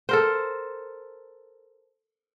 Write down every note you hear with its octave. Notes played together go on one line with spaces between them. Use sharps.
A4 A#4 C5